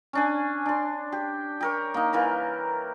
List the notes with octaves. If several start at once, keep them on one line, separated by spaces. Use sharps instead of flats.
C#4 D4 G#5
D4 C6
G4
G4 A#4 C#5
A#3 D#4
E3 A#3 A#4 B4